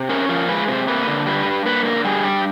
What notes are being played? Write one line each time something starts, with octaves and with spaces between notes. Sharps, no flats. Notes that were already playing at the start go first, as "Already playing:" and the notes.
Already playing: C3
C#4 A#4
F3 A#4
G#3 B4
C3 C5
A#3 B4
D3
G3 B4
G2
A#3 B4
D3 A#4
G3 G#4
G2 G4